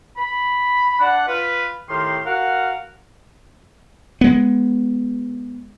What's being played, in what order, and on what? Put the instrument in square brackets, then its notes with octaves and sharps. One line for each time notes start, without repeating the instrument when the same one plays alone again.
[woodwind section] B5
D4 F#5
F4 B4
A2 D#3 G4 A#4 C6
F#4 A#4 F5 F#5
[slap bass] G#3 B3